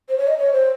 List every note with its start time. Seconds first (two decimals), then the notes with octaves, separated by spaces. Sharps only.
0.09 C5
0.18 C#5
0.28 D#5
0.38 C#5
0.52 C5